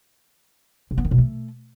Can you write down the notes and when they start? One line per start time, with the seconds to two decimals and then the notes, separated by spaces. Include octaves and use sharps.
0.91 C3
0.98 B3
1.04 D#3
1.11 B2
1.18 A3